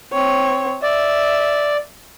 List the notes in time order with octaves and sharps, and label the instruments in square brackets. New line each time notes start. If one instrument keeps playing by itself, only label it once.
[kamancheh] C4 C#5
[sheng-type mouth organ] D5 [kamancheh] E5